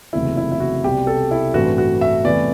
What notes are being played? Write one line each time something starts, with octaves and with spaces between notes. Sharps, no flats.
F#1 E2 C3 E3 A3 E4
E4
E4
F#4
C2 B2 G3 C4 G4
A4
E4
A1 G2 E3 A3 C4 F#4
F#4
E5
E2 C3 E3 A3 D5